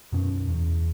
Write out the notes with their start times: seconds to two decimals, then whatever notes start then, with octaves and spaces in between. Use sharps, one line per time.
0.12 F#2 B2 C#4
0.48 E2